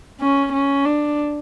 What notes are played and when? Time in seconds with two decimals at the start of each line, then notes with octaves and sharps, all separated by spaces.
0.21 C#4
0.53 C#4
0.86 D4